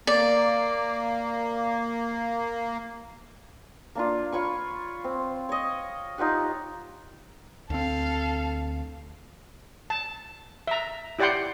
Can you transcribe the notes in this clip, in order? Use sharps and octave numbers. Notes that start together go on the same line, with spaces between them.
A#3 D5
A#3 D4 F4
F4 C#5 B5 C#6
C4
C#5 D#5
D#4 F4 G4 F#5
D2 C4 A4 F5
A5
E5 A#5
E4 G4 D5 F#5 G5 C6